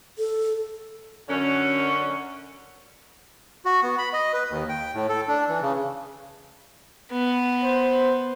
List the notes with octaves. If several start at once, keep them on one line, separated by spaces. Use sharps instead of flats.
A4
F#2 D3 C#4
F#4
B3
B5
D#5
B4
D#2
G5
A2
A4
D4
E3
C#3
B3
C5